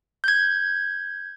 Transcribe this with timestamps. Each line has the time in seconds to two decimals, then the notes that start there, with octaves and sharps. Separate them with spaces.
0.24 G6 G#6